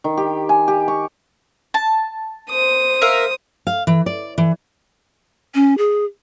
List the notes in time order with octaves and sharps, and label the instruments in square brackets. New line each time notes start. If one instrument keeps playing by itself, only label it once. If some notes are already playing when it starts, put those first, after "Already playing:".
[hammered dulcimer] D#3
G4
G#5
G4
C#6
[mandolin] A5
[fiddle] C5 D#6
[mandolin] A#4 E5 F5
[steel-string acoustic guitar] F5
E3
D5
E3
[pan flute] C#4
G#4